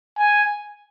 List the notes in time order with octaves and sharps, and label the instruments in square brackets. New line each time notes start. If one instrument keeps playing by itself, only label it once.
[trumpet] G#5